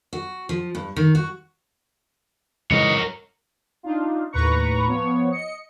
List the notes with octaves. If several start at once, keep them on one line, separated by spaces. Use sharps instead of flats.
F#4
F3
G2
D#3
F#4
G#2 C#3 E3 A#4 C#5 D#5
D4 D#4 F4
D#2 A2 B4 A#5 C#6
F3 B3 C#5
D#5 C#7